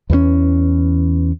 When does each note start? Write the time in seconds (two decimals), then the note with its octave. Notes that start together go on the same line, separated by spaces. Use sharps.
0.10 E2 E3 F#3 C#4